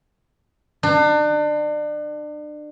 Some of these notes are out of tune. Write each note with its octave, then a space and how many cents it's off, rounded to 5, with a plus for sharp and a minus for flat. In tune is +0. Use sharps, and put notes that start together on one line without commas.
D4 +35